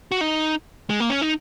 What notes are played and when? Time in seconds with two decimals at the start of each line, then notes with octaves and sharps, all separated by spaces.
0.11 F#4
0.21 D#4
0.90 G#3
1.00 A#3
1.10 C#4
1.22 D#4